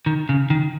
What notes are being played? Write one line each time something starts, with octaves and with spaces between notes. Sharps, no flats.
D#3
C#3
D#3